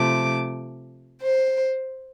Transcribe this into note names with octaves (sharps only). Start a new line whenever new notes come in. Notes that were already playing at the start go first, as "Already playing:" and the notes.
Already playing: C3 F3 A3 D6
C5